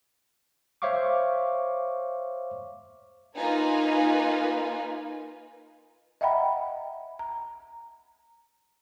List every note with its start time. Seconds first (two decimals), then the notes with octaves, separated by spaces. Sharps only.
0.82 C5 C#5 E5 F5 C#6 D6
3.36 A#3 D#4 F4 B4 G#5
6.21 D#5 E5 F#5 G5 A#5 B5
7.19 A#5